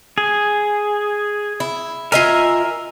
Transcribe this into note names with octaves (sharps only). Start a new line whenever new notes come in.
G#4
E4
F4 A#4 D#5 E5 G#5